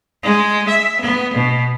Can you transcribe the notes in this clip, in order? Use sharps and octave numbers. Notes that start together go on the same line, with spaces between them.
G#3
E5
B3
B2